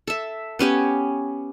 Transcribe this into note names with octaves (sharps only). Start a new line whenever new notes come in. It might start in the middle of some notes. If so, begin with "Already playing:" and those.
A4 E5
B3 C#4 G4 C#5